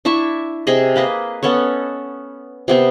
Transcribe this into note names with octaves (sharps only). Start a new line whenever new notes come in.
D4 E4 E5 C#6
C3 G#4 D#5
A#3 B4 D#5
B3 C#4 A4 C#5
C3 B3 C4